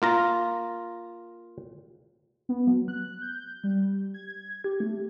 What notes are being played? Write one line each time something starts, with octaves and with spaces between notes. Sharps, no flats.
A#3 F4 A#5
B3
F#3
F#6
G6
G3
G#6
G4
A3